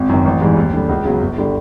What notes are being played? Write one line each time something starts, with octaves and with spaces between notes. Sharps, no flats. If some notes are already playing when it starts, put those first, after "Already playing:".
Already playing: G#1
F#2 D#3
A1
G#2 E3 G3
D#2
D3 G3
C#2
C#3 F#3 B3
G1
D3 G3